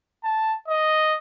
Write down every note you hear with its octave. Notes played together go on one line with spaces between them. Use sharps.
A5
D#5